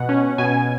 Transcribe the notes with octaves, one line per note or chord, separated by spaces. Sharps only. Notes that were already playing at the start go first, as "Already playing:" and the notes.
Already playing: B2 F#5
C#4
B2 G#5